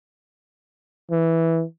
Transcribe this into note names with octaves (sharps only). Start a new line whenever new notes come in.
E3